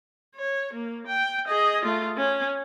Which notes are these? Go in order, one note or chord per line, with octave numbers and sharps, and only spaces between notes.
C#5
A#3
G5
G#4 D#5
A3 F4
C#4